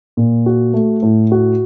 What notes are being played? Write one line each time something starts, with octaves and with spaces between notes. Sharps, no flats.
A#2
F#4
A3
A2
F#4